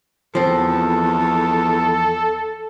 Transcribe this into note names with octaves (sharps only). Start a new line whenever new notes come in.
E2 F3 C4 A4